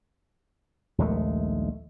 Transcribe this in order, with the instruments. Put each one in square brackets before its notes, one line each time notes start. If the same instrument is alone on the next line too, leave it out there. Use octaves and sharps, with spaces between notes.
[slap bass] A#1 D#2 G#3 A3